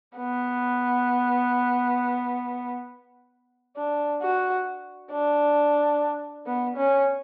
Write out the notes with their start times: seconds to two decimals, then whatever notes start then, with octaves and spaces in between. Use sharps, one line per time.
0.18 B3
3.77 D4
4.22 F#4
5.12 D4
6.47 B3
6.77 C#4